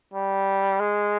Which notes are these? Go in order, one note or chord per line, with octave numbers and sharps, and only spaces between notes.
G3
G#3